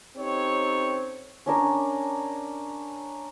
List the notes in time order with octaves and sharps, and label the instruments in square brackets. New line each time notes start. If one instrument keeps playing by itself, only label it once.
[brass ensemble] C4 C#4 D#4 G4 A4 C#5
[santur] C#4 D4 A#4